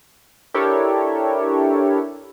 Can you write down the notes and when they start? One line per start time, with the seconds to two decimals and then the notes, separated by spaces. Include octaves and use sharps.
0.54 D4 E4 G4 A4 A#4 C#5